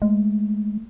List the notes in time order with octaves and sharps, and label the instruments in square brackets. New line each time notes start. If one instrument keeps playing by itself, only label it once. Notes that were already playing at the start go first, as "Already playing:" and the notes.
[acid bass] G#3 [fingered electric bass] A3